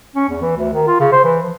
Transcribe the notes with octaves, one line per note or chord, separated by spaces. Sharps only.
C#4
E2
E3
D2
D#3
F4
C#3
C5
E3
F3